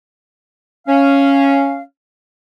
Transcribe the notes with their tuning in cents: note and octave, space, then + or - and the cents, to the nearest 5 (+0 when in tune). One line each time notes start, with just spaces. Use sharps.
C#4 +0 F5 -10